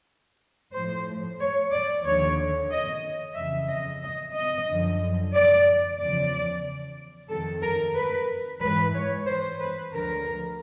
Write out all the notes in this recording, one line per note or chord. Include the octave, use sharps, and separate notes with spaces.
A2 F3 C5
C#5
D5
D#2 D3 F3 C#5
D#5
F2 C#3 E3 E5
D#5
D#5
D#5
F#2 D3 F3
D5
E2 C#3 F3 D5
F2 C3 D#3 A4
A#4
B4
G#2 E3 B4
C#5
C5
B4
D2 D3 F3 A#4